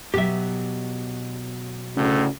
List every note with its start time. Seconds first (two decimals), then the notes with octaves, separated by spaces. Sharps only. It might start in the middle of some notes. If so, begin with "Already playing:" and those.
0.14 B2 F#3 G4 E5
1.96 D2 A2 C#3